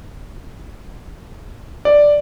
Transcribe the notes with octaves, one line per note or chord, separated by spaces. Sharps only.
D5